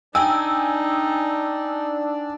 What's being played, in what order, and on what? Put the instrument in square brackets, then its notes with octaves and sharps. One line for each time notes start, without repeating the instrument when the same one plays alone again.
[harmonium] D4 D5 [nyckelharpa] D#4 [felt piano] G5 G#5 [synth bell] E6